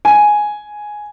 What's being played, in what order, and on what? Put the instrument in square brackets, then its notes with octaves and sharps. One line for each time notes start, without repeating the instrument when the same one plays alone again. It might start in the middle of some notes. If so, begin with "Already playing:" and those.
[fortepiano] G#5